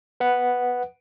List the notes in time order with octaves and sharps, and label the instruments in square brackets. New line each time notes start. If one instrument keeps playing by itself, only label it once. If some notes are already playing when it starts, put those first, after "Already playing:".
[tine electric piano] B4 F#5